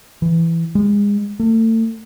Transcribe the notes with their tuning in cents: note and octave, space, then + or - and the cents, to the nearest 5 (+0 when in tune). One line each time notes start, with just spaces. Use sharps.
E3 +10
G#3 -30
A3 +40